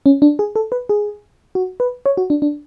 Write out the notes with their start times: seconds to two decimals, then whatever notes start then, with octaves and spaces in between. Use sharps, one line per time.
0.06 C#4
0.22 D4
0.39 G#4
0.56 A4
0.72 B4
0.89 G#4
1.55 F#4
1.80 B4
2.06 C#5
2.17 F#4
2.30 D4
2.42 D4